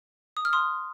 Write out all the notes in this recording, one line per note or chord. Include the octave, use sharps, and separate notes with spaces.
D#6
F6
C6 D#6